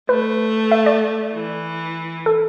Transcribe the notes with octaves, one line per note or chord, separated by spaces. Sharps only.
A3 B4
E5
D5
E3
A4